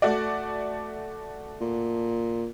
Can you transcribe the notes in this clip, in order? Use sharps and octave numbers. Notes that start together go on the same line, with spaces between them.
A3 F#4 D5
A#2